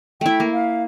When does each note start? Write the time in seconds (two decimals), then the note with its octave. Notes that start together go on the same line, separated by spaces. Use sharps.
0.21 A3 E4 G5
0.40 A#3
0.53 F5